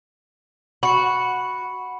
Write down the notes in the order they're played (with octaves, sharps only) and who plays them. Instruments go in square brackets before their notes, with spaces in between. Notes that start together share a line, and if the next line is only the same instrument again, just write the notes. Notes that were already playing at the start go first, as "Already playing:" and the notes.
[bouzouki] F#4 [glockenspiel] B5 C#7